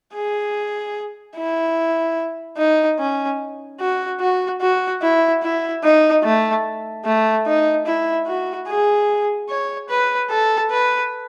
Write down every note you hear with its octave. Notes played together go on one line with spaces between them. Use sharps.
G#4
E4
D#4
C#4
F#4
F#4
F#4
E4
E4
D#4
A3
A3
D#4
E4
F#4
G#4
C#5
B4
A4
B4